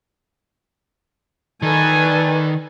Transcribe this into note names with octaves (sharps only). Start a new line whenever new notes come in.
D#3 A4 B4 D5 G#5